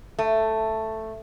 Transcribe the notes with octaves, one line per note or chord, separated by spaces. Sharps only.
A3